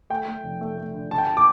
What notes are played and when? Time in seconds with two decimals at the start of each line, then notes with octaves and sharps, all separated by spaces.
0.10 A3 G5
0.28 A3
0.44 F1
0.61 A3
0.78 A3
0.94 D3
1.11 D3 A5
1.18 G5
1.26 A5
1.37 D6